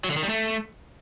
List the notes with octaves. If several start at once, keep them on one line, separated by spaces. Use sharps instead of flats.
F#3
D3
D#3
G3
A3